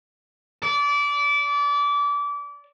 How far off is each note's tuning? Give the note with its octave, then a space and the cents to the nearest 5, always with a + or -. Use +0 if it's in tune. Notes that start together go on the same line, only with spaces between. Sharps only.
D5 -25